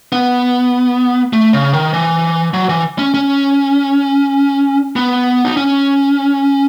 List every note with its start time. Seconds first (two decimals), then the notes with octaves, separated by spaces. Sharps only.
0.12 B3
1.33 A3
1.53 C#3
1.73 D#3
1.93 E3
2.54 F#3
2.69 E3
2.99 C#4
3.14 C#4
4.96 B3
5.45 D#4
5.57 C#4